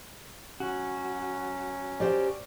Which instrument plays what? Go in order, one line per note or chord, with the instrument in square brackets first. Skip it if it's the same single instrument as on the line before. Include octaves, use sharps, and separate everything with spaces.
[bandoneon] F#3 C#4 [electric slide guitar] F#4
[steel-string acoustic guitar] G4 C5 G5 [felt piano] D5